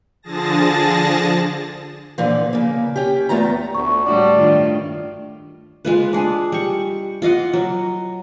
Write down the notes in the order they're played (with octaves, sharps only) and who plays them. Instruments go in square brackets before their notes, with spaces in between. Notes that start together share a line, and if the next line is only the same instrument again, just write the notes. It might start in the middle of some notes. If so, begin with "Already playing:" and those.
[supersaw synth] D3 F3 G#4 A5 A6 A#6
[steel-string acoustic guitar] A#2 D3 E3 F3
C#3 A#3
C#4 G4
E2 A3 B3 F4 A#5
[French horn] D2 [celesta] C#6
[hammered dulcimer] A2 D4 [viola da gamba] G3 F#4 [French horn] D5 [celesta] D6
[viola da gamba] G2 D#3 F4
[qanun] G#3 F4 B4
D4 G#4
G3 C#6
F4 D#5 F5 F#5
F#3